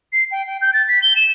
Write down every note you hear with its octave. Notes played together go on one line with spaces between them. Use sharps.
C7
G5
G5
G6
A6
B6
G7
E7